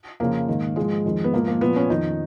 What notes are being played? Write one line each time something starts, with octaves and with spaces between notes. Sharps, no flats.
F2 C#3 F3 A#3
G#2 D#3
G#2 F3 G#3
F2 D#3
B3
G#2 F3 A#3
A#3
A#2 F3 B3
C#4
F2 D#3 D#4